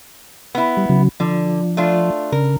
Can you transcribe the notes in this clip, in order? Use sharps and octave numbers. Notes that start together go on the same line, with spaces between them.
B3 E4
G3
C#3 F#3
D3 F3
A3 D4 F4
C#3 A#4